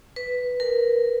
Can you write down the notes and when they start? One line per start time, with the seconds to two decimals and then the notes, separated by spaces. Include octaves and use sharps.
0.16 B4
0.60 A#4